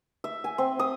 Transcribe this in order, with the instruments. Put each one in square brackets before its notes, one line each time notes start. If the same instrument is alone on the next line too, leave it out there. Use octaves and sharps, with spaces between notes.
[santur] E5
G#5
C4
D#6